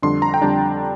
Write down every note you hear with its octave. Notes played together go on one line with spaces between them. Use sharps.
F2 D3 G3 D4 C6
A#5
G5
F2 D3 G3 D4 A5